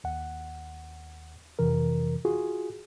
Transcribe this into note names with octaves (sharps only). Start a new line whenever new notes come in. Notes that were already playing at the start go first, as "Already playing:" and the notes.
D#2 F#5
F2 C3 E3 A#4
F4 F#4 G#4